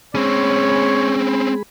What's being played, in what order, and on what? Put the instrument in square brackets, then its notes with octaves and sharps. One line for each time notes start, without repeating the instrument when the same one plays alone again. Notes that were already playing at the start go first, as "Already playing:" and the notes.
[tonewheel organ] G#3 G#4 B5 [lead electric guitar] C4 C#4 [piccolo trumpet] C#5